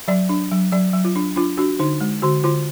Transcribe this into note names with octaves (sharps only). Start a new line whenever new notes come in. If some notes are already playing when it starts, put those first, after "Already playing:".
F#3 D5
D4
F#3
F#3 D5
F#3
F4
D4
D4 F4
D4 F#4
D3 D#4
G#3
D3 F#4
D3 F4